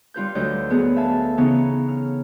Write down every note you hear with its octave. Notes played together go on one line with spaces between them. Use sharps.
G3 F4 B4 G6
D2 F#3 D#5 G6
B3 G#4
A4 E5 F5 G#5 A5
C#3 E3 B3 C#4 D#4
F6